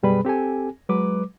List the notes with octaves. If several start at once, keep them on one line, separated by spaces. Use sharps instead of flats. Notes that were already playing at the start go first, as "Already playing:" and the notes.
F#2 B2 G3 G#4 B4 B5
C4 G4 A4 G#5
F#3 G#3 B4 D6